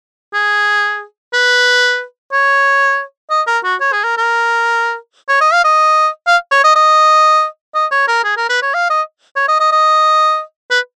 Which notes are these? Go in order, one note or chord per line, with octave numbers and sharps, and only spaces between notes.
G#4
B4
C#5
D#5
A#4
F#4
C#5
G#4
A#4
A#4
C#5
D#5
F5
D#5
F5
C#5
D#5
D#5
D#5
C#5
A#4
G#4
A#4
B4
C#5
F5
D#5
C#5
D#5
D#5
D#5
B4